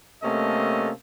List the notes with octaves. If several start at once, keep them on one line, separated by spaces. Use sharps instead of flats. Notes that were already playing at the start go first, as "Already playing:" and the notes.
C3 A3 A#3 C#4 A4 D#5